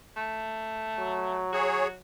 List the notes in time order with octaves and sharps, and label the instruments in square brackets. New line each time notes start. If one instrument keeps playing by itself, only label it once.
[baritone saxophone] A3
[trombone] F#3
[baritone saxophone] F#4 [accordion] G#4 C#5